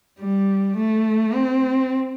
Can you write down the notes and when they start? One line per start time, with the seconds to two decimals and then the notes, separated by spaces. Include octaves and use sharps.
0.20 G3
0.77 A3
1.34 C4